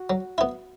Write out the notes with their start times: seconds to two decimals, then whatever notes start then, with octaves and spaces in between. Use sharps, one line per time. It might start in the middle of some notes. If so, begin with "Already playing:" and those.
Already playing: F#4
0.10 F#3
0.38 B3 E4